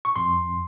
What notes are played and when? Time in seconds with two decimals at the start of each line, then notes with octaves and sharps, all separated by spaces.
0.05 C#6
0.16 F2 C6